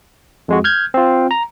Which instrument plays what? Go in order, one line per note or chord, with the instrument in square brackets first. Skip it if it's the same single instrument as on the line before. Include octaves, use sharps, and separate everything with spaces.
[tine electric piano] F2 G#3 F#4
F6 G6 G#6
C4 F4
A#5